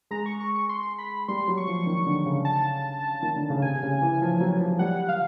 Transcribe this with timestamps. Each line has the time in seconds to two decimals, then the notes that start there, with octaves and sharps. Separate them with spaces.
0.11 G#3 A#5
0.26 C#6
0.40 C#6
0.55 C#6
0.69 C6
0.98 B5
1.28 G3 C6
1.48 F#3
1.57 C#6
1.67 F3
1.87 D#3
2.06 D3
2.26 C#3
2.45 A5
3.22 D#3
3.36 D3
3.50 C#3
3.62 C3 G#5
3.83 C#3
4.02 E3
4.22 F3
4.40 F#3
4.61 F3
4.79 G3 F#5
5.08 F5